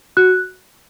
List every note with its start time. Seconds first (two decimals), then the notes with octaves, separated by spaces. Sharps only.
0.17 F#4 F#6